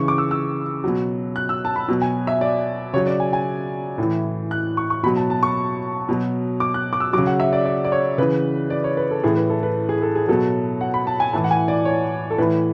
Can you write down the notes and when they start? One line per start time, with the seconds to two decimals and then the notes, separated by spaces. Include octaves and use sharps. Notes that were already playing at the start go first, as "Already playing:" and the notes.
Already playing: C#3 E3 C#6
0.08 D6
0.18 E6
0.31 E6
0.84 B2 F#3
1.36 F#6
1.49 E6
1.65 A5
1.76 B5
1.88 B2 F#3
2.02 G#5
2.27 E5
2.41 D5
2.94 C#3 F#3 C#5
3.07 D5
3.20 G#5
3.33 G#5
3.98 A2 E3
4.51 F#6
4.77 C#6
4.90 C#6
5.03 B2 B5
5.06 F#3
5.16 A5
5.30 A5
5.43 C#6
6.09 B2 F#3
6.60 D6
6.74 F#6
6.93 D6
7.00 E6
7.13 F#3 D6
7.18 C#3
7.27 F#5
7.40 E5
7.53 D5
7.65 D5
7.84 D5
7.92 C#5
8.18 C#3 E3 B4
8.70 D5
8.84 C#5
8.97 B4
9.11 A4
9.23 A2 E3 G#4
9.37 B4
9.49 A4
9.63 B4
9.89 G#4
10.02 A4
10.15 G#4
10.28 B2 F#3 A4
10.81 F#5
10.94 B5
11.07 A5
11.20 G#5
11.33 A2 E3 A5
11.44 F#5
11.51 G#5
11.68 D5
11.85 C#5
12.30 A4
12.38 A2 B4
12.41 E3